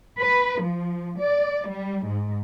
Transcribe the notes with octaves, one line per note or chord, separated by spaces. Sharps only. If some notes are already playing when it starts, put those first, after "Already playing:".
B4
F3
D5
G3
G#2